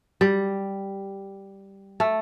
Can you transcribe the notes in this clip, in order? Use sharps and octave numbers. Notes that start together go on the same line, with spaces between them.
G3
A3